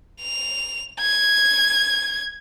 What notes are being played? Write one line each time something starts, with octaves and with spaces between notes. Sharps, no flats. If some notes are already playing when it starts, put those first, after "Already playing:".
F7
G#6